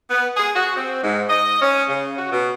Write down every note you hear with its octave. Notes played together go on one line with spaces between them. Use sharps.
B3
G#4
F#4
C4
G#2
D#5
C#4
C#3
F#4
B2